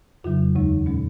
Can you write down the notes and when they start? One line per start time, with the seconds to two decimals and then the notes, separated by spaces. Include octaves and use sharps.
0.24 F2 C#3 F#3 F4
0.55 D#2 D#3 G#3 D#4
0.86 A#2 G#3 C#4